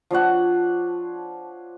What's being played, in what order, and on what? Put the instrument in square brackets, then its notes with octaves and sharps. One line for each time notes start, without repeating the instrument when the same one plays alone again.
[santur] F3 D4 C#5 F#5